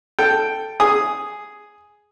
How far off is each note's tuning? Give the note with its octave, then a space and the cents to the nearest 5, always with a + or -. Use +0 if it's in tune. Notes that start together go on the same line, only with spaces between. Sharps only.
A4 +0 G5 +0
G#4 +0 D#6 +0